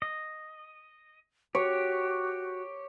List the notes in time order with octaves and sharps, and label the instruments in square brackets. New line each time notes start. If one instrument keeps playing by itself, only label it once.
[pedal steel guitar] D#5
[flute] F#4 [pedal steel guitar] G4 [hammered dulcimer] C#5